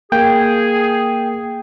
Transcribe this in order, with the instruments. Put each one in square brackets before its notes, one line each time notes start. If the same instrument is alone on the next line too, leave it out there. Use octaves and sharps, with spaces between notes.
[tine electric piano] A#3 [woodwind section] G#4 [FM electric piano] G5